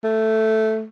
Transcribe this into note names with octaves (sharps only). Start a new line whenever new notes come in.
A3